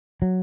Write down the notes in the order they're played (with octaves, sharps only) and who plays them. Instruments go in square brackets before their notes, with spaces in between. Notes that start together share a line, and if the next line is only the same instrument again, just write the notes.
[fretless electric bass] F#3